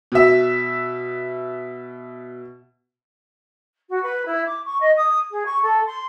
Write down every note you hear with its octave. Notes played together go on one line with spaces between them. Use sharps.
B2 E5
F#4
B4
E4
D6
C#6
D#5
D#6
G#4
C#6
A4
C6